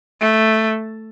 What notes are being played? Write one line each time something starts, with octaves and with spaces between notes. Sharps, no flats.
A3